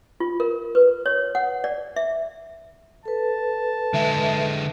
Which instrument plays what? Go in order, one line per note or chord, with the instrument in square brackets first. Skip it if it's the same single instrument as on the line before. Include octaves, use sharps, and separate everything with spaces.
[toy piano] F4
A#4
B4
C#5
F#5
D5
E5
[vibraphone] A4 B4 [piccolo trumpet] A5
[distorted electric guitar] D3 G#3 [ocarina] E5